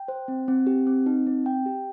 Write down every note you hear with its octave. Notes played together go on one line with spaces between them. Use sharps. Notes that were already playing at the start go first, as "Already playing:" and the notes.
Already playing: G5
C5
C4
C4
G4
C4
D#4
C4
G5
G4